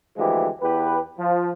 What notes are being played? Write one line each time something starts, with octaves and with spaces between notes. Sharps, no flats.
D2 E3 F3 G#3 G4
E2 G4 B4
F3